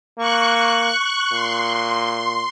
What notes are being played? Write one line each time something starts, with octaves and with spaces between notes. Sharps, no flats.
A#3 C#6 F#6
A#2 C6